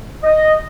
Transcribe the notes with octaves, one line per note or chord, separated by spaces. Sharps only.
D#5